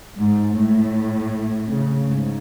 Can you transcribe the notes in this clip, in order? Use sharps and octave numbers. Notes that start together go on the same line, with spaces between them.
G#2
A2
C#3
G#2